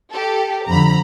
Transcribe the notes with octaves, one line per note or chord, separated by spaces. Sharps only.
G4 A4
F2 D3 A#5 B5